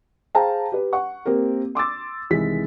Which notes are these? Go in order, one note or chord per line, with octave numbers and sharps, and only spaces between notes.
G#4 C5 F5 G5 A5 A#5
G4 B4
F#5 C#6
A#3 C4 G4 A#4
C6 D6 E6 A6
C2 D#3 E3 G#3 B6